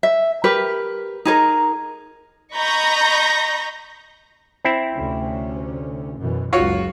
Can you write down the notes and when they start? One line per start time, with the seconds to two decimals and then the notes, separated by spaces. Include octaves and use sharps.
0.03 E5
0.44 G4 A#4 B4
1.25 D#4 G#4 A#4
2.56 D#5 A#5 B5 C#6 G6 A#6
4.65 C4 E4
4.94 D2 C3 C#4
6.19 F#2 B2 E3
6.53 F#1 C#2 F#3 F4 F#4 C#5